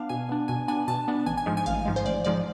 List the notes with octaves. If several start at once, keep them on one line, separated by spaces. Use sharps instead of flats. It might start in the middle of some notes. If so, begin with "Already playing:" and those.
Already playing: B3 D4 F5
B2 G#5
B3 D4
B2 G#5
B3 D4 G#5
B2 A5
B3 D4
A1 G#5
G#5
G#2 F3 G#3
G#5
A1 F5
G#2 F3 G#3
C5
A1 D5
G#2 F3 G#3 D5